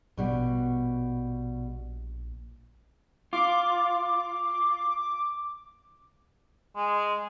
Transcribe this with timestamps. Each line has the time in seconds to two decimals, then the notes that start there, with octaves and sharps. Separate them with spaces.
0.17 A#1 B2 G3 F#4
3.33 F4 D6
6.76 G#3